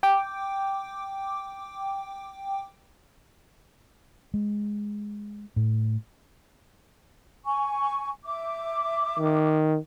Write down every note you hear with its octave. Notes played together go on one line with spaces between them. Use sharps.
G5 D6
G#3
A2
G#5 C#6
E5 D6
D#3